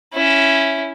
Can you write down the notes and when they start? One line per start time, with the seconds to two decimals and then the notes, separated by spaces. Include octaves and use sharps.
0.14 C#4 E4